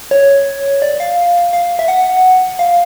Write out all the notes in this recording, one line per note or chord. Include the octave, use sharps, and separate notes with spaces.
C#5
D5
F5
F5
E5
F#5
F5